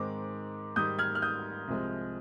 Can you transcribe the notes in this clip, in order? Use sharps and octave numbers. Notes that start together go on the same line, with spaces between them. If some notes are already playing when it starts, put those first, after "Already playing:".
Already playing: G#2 D#3 G#3 C4 D6
G#2 D#3 G3 D#6 G6
F6 G#6
F6
D#6 G6
C2 C3 F3 G#3